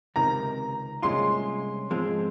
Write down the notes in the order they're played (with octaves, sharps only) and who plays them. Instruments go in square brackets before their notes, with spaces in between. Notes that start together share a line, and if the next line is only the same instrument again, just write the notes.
[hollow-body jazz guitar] C#2 C3 D#3 [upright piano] A#5
[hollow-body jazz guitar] C2 A#2 G#3 C#4 F4 [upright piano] C6
[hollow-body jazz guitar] G#2 F3 G#3 C4 F4